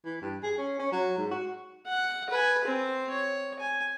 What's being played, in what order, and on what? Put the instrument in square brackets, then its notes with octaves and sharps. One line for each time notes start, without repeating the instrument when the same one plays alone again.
[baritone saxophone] E3
G2
G#4
C#4
C#4
F#3
G#2
F#4
[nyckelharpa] F#5
B4 G#5
C4 C5
C#5
G#5